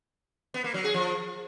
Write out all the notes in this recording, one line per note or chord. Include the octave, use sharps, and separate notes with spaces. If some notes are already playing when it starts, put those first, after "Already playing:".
B3
A#3
F#3
G#4
F3